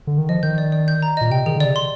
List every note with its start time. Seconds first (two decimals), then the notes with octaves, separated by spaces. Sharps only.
0.07 D3
0.18 D#3
0.29 F3 D#5
0.43 D#3 G6
0.58 D5
0.72 D5
0.88 G6
1.02 A#5
1.17 A#2 D#5
1.31 C3 G5
1.46 D#3 G#4
1.56 D3
1.60 C3 D5
1.76 C6